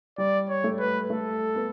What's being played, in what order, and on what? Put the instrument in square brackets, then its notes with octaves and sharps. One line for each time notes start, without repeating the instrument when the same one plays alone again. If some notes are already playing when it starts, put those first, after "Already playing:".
[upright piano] G3 [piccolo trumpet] D5
[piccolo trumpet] C#5
[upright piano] A3
[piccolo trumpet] B4
[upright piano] A3 [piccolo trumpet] A4
[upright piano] B3